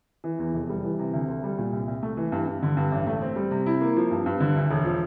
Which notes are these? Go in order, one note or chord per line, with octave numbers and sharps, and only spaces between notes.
E3
E2
F1
G3
E3
C3
D2
D2
G3
A#2
C2
C2
A3
E3
G2
G2
D3
G2
A1
A3
C4
G3
C3
E4
A#3
F3
G2
G2
D3
D2
E1
F3